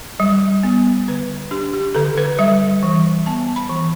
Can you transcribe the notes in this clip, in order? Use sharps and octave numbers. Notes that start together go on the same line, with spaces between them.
G3
B3
D3 B4
D4 G4
G4
D3 A4
B4
G3 E5
E3
B3 A5
B5
E3